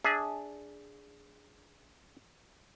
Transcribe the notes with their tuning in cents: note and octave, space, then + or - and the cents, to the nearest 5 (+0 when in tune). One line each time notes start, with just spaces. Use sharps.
D4 -5 G#4 +0 E5 -30